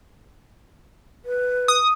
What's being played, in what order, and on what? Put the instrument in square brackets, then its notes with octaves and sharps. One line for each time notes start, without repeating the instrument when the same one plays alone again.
[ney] B4
[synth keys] D#6